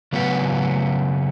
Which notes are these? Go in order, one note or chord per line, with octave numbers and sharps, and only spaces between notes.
C#3 F#3 B3 F#4 B4